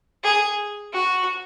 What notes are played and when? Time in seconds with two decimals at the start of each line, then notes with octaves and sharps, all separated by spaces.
0.24 G#4
0.93 F#4